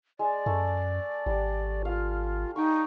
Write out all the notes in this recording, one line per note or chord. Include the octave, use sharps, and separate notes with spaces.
G#3 D5
F#2 A3
G#1 G3
F4 F5
D#4 G5 C#6